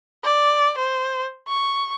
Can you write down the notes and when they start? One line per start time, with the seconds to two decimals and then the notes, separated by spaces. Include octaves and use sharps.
0.24 D5
0.78 C5
1.48 C#6